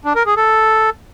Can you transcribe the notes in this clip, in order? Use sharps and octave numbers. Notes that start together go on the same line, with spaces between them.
D4
A#4
G#4
A4